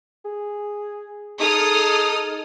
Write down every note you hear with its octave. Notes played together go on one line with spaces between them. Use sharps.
G#4
D#4 G#4 A4 D#6 F6